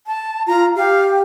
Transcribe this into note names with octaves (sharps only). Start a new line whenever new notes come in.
A5
F4 A#5
G4 F5